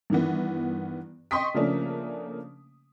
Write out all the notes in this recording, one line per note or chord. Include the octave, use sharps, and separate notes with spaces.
G2 D#3 E3 B3
D#5 G5 C6 C#6 D#6 B6
C#3 F3 A3 A#3 C#4 D4